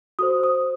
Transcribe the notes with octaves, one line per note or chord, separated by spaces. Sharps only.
F#4 A4 C5 D#6
D#6